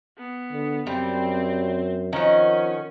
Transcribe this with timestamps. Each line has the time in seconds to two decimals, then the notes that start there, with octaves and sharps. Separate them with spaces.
0.18 B3
0.53 D3
0.87 F#2 G3 C4
2.13 D#3 F3 C#4 F#5